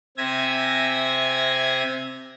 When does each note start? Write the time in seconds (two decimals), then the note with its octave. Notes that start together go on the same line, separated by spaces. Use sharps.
0.17 C3 C4 E5 G#5 G#6 A#6